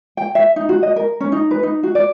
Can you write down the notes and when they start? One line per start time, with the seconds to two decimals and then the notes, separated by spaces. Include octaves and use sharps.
0.17 G5
0.35 E5
0.56 D#4
0.69 F#4
0.83 D#5
0.96 A#4
1.20 C#4
1.32 D#4
1.51 B4
1.63 D#4
1.83 F#4
1.95 D5